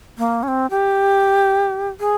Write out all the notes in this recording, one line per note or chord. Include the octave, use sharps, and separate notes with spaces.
A#3
C#4
C4
G4
G#4